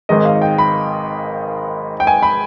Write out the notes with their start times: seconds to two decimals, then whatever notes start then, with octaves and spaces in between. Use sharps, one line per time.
0.09 G#1 G#2 D#3 G#3 D#5
0.25 F5
0.42 G5
0.58 B5
2.00 G5
2.07 G#5
2.22 B5